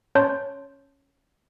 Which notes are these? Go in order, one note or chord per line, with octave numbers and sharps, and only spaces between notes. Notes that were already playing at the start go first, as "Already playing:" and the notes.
C#4 C#5 A5 C6 G6